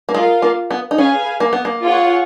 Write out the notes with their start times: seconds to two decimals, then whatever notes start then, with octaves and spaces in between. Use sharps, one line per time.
0.09 A#3
0.14 G#3 F4 A#4 F5
0.42 A#3
0.71 B3
0.91 D#4
0.98 C#4 G#4 B4 F5 G#5
1.40 A#3
1.53 B3
1.65 A#3
1.82 F4 G#4 C#5 F#5